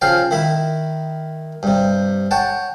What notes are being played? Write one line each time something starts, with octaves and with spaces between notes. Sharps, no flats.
C#3 F3 F5 G5
D#3 E4 B5
G2 C3
C#5 F#5 G5 A5